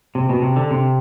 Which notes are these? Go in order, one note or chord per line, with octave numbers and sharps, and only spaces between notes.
C3
B2
C3
D3
C3